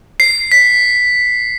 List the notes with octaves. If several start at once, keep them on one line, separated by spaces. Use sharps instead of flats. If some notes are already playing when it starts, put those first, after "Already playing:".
C7
B6